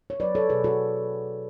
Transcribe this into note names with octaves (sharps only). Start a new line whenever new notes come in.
C#5
F#3 B4 D5
A4 C#5
B2 G#4 B4
F#4 A4